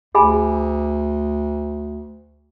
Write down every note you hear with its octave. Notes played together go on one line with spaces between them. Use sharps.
D2 G#4 G#5 B5